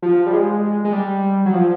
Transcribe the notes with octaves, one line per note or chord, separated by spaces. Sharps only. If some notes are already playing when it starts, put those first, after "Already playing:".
F3
G3
G#3
G#3
G3
F#3
F3